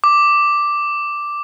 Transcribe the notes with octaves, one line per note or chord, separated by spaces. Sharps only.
D6